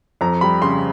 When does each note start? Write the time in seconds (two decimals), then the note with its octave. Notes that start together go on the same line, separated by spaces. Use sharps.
0.21 F2 A#5
0.41 G3 B5
0.62 C#3 C6